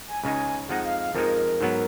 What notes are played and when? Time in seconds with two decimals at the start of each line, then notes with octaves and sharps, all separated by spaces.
0.08 G#5
0.23 C#2 C#3 G#3 D#4 G#5
0.69 F2 F3 G#3 D#4 F#5
0.85 F5
1.00 F5
1.15 F2 F3 G#3 D#4 A#4
1.61 G#2 F#3 B3